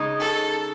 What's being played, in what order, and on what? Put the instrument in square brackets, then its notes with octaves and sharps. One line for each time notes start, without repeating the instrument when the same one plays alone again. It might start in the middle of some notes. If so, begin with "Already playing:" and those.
Already playing: [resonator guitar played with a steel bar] C#3 G#3 D#4
[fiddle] A4